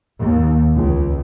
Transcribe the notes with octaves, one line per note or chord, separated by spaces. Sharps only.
D#2
C#2